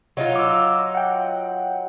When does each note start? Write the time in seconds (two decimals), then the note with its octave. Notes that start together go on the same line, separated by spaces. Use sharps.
0.17 F#3 D#4 F4
0.36 D6 E6
0.95 F#5 G5